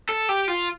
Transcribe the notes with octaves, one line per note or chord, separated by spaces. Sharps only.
A4
G4
F4